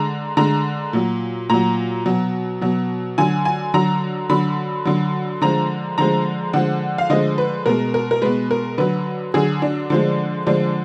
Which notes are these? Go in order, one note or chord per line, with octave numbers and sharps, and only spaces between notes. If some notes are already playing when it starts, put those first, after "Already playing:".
Already playing: D3 G#3 A#5
D3 G#3 A#5
A#2 F#3
A#2 F#3 A#5
B2 F#3
B2 F#3
D3 F#3 G#5
G#5
D3 F#3 A#5
D3 F#3 B5
D3 F#3
D3 F3 G#3 A#5
D3 F3 G#3 A#5
D3 F3 G#3 F#5
F5
D3 F3 G#3 D#5
B4
B2 G#3 A#4
A#4
A#4
B2 G#3 B4
A#4
D3 F#3 B4
D3 F#3 G#4
D4
D3 F3 G#3
D3 F3 G#3 D4